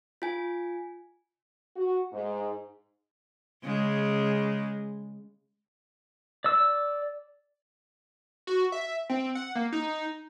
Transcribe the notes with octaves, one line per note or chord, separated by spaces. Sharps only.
F4 G#5
F#4
G#2
C#3 G#3
D5 E6
F#4
E5
C4
F#5
A#3
D#4